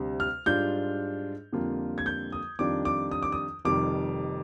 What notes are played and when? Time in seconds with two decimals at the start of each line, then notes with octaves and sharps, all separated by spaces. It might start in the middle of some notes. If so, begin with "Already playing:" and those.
Already playing: D2 C3 G3
0.20 F6
0.46 G#2 G3 D4 F4 G6
1.53 F2 D3 G3 A#3 F4
1.98 G#6
2.06 G6
2.32 D#6
2.59 F2 D#3 G3 D4 F4 D6
2.85 D6
3.11 D#6
3.23 D6
3.32 D#6
3.65 F1 F2 D#3 G3 D6